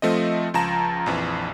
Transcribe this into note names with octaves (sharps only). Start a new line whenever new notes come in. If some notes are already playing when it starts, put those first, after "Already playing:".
F3 A3 C4 D#5
C#2 F3 A5 A#5 A#6 E7
A#1 F2 E3